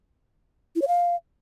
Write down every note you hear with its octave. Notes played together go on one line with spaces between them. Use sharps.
E4
C#5
F5